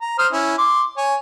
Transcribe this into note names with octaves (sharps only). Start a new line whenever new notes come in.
A#5
C5 D#6 F6
C#4 E4
C6 D6
C#5 G#5